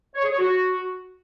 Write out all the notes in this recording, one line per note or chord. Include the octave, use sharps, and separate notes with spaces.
C#5
G#4
C#5
F#4